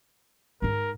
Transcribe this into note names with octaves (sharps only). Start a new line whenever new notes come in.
G#2 D#4 A#4